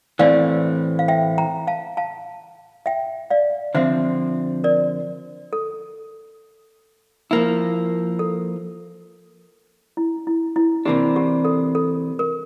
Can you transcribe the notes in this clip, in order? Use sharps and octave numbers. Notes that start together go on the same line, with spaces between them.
A2 E3 A3 C4 D5 F5
F5
E5 G5
G5 A#5
F5 A5
F5 A5
E5 G5
D5 F5
D3 F3 C4 C5 E5
A#4 D5
A4
F3 A#3 E4
A4
E4
E4
E4
C3 E3 A#3 D4 G4
G4
A4
A4
A#4